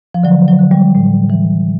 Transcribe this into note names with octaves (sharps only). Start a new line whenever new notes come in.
F3
D3 F#3
F#3
D3
G3
A2
E3